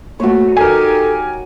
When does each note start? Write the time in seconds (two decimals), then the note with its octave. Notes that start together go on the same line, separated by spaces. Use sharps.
0.20 A3 A#3 F#4 C#5
0.57 D#4 G4 A4 A#4 G#5